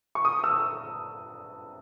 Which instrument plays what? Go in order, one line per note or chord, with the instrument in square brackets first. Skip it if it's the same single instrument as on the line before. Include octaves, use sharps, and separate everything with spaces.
[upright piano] C#6
D#6
E6